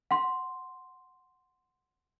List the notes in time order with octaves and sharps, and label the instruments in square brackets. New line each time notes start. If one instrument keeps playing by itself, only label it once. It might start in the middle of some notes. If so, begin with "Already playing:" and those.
[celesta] F#5 C6